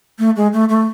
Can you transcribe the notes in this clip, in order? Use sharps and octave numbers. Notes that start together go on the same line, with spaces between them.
A3
G#3
A3
A3